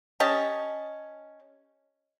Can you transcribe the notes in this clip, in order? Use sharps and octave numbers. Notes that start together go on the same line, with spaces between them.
C#4 G4 D#5 A5